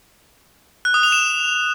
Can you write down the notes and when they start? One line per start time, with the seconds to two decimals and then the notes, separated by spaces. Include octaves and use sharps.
0.85 F#6
0.94 D#6
1.03 F7
1.12 E7